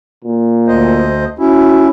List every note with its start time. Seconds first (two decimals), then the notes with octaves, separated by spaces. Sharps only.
0.25 A#2
0.68 D2 C5 D#5
1.39 C#4 E4 F#4